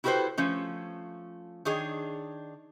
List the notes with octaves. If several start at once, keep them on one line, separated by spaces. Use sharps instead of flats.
E4 F#4 G4 A4 B4 C5
F3 A3 C#4
D#3 D4 G#4 C#5